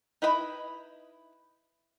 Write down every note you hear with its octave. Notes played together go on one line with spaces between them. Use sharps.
D#4 E4 B4 D#5 B5